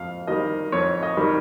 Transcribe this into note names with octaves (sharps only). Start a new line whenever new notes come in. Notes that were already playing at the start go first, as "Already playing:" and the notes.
Already playing: F2 F5
D#3 G3 D#5
F2 C#5
D#5
D#3 G3